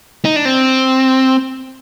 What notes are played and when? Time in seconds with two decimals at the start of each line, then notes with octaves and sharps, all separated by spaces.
0.25 D#4
0.36 D4
0.45 C4